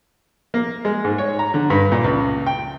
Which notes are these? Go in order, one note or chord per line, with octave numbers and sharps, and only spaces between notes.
A#3
G#3
G#2
C#5
A#5
D3
G2
A#2
C#2
G5